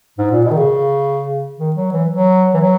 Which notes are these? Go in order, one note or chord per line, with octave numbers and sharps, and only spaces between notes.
G#2
A#2
B2
D#3
C#3
D#3
F#3
E3
F#3
E3
F#3